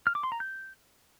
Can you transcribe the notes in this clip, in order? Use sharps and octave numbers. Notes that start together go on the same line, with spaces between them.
F6
D6
C6
A#5
G6